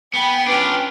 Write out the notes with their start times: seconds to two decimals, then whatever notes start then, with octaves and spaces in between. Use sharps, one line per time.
0.14 B3 G5 G#5 B5
0.47 C#4 D4 F4 B4